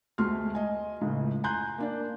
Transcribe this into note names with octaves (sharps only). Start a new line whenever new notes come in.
D2 G#3 A3 C6 F6
D#5 G#5
C#2 A2 C#3
G#5 A#5 C6 F#6 G6
A#3 D4 D5